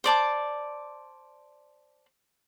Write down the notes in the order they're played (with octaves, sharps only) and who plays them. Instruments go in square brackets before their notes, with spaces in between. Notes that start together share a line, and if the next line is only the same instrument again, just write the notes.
[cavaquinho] C5 D5 A5 D6